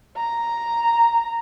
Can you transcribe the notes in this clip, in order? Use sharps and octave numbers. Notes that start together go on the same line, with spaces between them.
A#5